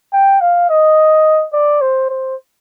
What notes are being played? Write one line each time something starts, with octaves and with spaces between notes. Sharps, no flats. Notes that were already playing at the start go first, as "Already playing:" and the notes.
G5
F5
D#5
D5
C5
C5